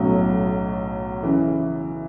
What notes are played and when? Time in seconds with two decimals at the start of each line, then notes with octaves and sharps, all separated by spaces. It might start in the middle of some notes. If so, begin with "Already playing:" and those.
Already playing: B1 A2 F#3 C#4
1.23 C#3 E3